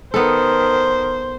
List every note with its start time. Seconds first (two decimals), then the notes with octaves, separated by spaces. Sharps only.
0.14 D#3 B3 A4 C5